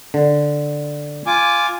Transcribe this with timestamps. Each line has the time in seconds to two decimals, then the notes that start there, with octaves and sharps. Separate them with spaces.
0.14 D3
1.26 F4 G#5 D6